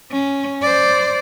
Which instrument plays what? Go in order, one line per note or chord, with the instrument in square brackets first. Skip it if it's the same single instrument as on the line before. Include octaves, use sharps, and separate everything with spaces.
[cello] C#4
C5 D5